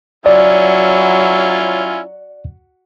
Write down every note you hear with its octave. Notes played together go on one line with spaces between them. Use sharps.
F#3 C#4 E4 F4 D5